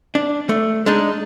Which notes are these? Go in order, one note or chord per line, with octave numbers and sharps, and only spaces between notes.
D4
A3
G#3 D4 D#4